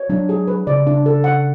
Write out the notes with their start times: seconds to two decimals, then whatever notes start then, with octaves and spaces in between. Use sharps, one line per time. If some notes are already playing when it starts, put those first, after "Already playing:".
Already playing: C#5
0.09 F#3 D4
0.29 G#4
0.48 B4
0.67 C#3 D5
0.87 D4
1.06 A4
1.24 F#5